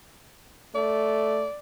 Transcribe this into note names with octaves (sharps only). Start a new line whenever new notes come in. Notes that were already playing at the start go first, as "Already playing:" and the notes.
A3 D5